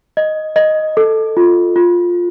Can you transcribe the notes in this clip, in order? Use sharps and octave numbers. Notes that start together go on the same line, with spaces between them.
D#5
D#5
A4
F4
F4